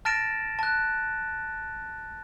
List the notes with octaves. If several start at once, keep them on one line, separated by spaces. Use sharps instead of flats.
A5 F6 A6 A#6 D7 E7
A5 F#6